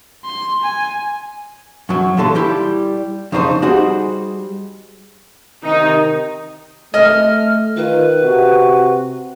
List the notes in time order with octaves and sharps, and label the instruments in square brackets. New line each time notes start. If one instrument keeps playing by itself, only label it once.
[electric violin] C6
G#5
[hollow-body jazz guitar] F#2 F#3
A#2 D3 E3 F#3 A4 C6
G3 E4 G4
F2 C#3 D4 D#4 F#4 C5
G3 D#4 F#4 G#4 C5
[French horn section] C3 D#3 [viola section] D#4
[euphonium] A3 [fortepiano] D#5 [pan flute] F6
[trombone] D#3 [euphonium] F4 [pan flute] B4
[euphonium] C3 [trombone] F#4